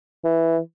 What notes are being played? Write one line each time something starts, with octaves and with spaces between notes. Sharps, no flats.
E3